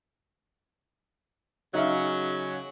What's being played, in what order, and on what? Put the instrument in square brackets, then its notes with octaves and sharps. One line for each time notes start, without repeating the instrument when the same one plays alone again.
[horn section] C#3 F#3 [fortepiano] D#4 E5 F5